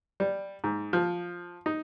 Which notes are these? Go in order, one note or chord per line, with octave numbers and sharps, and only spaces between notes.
G3
G#2
F3
D#4